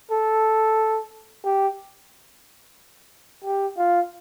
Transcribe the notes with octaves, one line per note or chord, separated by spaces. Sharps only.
A4
G4
G4
F4